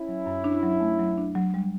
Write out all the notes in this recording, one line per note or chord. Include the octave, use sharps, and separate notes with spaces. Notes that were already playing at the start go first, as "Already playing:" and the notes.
Already playing: C#4 E4
F#3
F#2
D4
F#3
A3
F#3
D4
F#3
G3